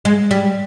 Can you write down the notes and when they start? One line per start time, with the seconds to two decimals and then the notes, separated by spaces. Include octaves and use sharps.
0.05 G#3
0.31 G3